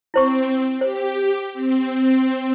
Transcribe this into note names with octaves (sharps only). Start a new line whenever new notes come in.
C4 E4 C5 C#6
G4 C5
C4